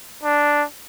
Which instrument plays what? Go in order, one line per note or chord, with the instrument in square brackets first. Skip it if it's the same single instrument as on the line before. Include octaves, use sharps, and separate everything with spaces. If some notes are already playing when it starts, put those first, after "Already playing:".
[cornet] D4